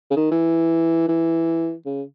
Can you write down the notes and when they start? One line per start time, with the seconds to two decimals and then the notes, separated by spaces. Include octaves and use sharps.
0.11 C#3
0.16 D#3
0.31 E3
1.08 E3
1.86 C#3